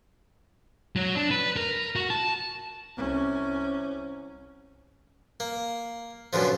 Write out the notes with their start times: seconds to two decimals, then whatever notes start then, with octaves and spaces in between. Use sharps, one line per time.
0.96 F#3
1.15 D4
1.31 B4
1.57 A#4
1.96 F#4
2.10 A5
2.97 C2 C#4
5.40 A#3
6.33 F#2 B2 D3 F3